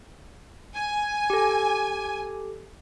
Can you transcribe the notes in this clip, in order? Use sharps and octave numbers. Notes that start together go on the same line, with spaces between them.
G#5
G4 A4